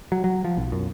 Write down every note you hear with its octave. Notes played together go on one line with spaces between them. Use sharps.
F#3
F#3
F3
B1
F#2